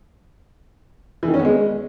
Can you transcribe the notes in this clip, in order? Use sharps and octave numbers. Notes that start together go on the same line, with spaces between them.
E3
D#3
C#4
B3
G#3